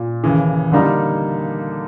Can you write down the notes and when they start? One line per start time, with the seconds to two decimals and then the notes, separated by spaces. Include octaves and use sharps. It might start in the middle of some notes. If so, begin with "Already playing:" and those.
Already playing: A#2
0.24 D#2 C#3 E3
0.72 D3 G3 A#3 D#4